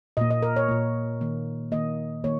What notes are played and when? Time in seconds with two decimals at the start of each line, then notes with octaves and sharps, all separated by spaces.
0.17 A#2 A#3 D#5
0.31 D#5
0.42 A#4
0.56 C#5
0.68 A#2 A#3
1.21 D#3 A#3
1.72 D#3 A#3 D#5
2.24 D#3 A#3 C#5